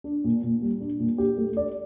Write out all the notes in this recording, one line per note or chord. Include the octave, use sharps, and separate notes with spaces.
D4
A#2
A#2
G3
D4
A#2
G4
A3
D5